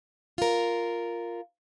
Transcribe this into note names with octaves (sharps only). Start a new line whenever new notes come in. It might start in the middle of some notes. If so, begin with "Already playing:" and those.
F4 A#4